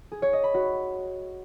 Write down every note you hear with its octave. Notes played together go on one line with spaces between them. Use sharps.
G#4
C#5
D#5
B5
F#4